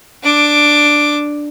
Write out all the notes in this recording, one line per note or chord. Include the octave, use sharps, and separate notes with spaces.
D4 D6